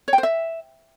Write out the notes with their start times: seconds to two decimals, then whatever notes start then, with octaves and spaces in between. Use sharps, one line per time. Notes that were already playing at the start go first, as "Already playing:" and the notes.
0.08 C#5
0.13 G5
0.18 C5
0.23 E5